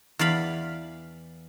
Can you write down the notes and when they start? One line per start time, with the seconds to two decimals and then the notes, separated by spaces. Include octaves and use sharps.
0.19 E2 D5 F5 B5